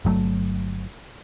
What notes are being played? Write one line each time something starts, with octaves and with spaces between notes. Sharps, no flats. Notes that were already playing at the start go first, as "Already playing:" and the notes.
G1 F#3 A3